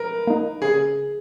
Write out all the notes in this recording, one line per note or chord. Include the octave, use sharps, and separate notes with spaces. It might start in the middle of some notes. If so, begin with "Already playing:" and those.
Already playing: A#4 B4
A#3 D#4
C#3 G#4